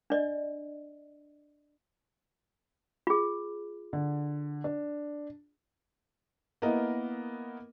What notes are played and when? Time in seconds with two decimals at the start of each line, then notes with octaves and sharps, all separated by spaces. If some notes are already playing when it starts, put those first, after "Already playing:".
0.10 D4 D5 D#5
3.07 F4 G#4
3.93 D3
4.64 D4
6.62 A#3 B3 E4 A#4 D#5